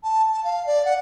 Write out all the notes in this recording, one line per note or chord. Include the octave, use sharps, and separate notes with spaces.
A5
A5
F5
D5
F#5